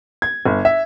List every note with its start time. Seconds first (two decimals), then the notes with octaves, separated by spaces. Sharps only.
0.22 G#6
0.46 G1
0.65 E5